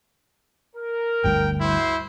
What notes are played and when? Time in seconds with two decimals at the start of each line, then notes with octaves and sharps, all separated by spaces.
0.75 A#4
1.24 G1 D2 G3 G5
1.60 E4 F#4 C5 C6